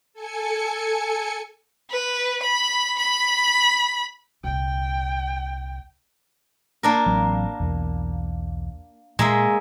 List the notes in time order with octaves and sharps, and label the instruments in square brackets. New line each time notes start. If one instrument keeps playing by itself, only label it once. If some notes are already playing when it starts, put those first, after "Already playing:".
[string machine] A4 G#5 C#7
[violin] B4
B5
B5
[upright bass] C2 A#2 [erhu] G5
[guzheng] A#3 D4 A#4
[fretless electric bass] A1 F#3 C4
B1 E2
[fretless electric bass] A#2 [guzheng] G#3 A#3 E5